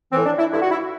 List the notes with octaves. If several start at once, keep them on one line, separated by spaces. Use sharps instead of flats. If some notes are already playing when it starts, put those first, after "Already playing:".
A2 E3 C4
D4
E4
G2 D3 E4
F#4
E4